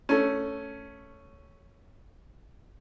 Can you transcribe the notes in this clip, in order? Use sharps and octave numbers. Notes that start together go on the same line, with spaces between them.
A3 C#4